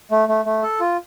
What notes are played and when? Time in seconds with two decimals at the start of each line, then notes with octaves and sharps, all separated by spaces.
0.11 A3
0.29 A3
0.45 A3
0.63 A4
0.80 F4